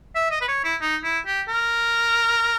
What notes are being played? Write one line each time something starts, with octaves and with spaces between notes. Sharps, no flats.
E5
D#5
B4
C#5
E4
D#4
E4
G4
A#4